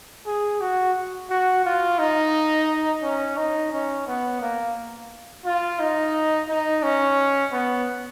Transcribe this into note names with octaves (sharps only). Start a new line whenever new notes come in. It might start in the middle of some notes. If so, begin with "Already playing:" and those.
G#4
F#4
F#4
F4
D#4
C#4
D#4
C#4
B3
A#3
F4
D#4
D#4
C#4
B3